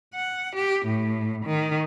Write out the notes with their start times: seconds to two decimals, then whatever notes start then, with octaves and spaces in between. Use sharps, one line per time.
0.14 F#5
0.56 G4
0.86 A2
1.45 D#3